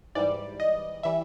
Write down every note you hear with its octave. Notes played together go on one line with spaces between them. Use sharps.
G#2 E3 G3 D5
D#5
E3 G3 E5